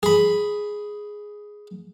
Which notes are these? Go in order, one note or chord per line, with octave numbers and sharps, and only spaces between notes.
G#4 B5